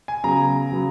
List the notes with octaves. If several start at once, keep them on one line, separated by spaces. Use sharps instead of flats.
G#5
C#3 F#3 B3 A#5
C#3 F#3 B3